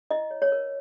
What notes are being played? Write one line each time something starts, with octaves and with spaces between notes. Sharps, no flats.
E4 D#5
C#5
C#5
A#4